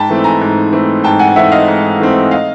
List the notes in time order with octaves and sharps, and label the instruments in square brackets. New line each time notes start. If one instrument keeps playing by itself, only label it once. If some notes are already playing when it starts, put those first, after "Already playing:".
Already playing: [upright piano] G#2 G5 A5 B5
E3 A3 C4
G#5 A#5
G#2
E3 A3 C4
G#2 G5 A5
F#5 G#5
E3 A3 C4 E5 F#5
D#5 F5
G#2
E3 A3 C4
D#5 F5